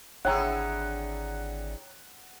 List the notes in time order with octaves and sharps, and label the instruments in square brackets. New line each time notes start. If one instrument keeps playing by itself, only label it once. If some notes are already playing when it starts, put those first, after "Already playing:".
[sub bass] G#1 [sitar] D3 E4 G#4 [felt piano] C#5 G5 A#5 [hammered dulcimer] F#5